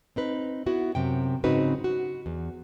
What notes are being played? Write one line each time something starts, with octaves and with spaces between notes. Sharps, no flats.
C4 D#4 B4
B3 E4 F#4
F#2 C3 G5
G#2 C#3 C4 D#4 F#4 B4
F#4
E2